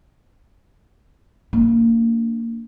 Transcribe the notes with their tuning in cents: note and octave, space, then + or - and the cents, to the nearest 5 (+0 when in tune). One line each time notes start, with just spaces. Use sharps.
A#3 -25 D4 -15